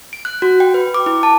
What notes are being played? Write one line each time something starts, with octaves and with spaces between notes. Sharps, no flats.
D7
F#6
F#4
G5
B4
D6
E4
A5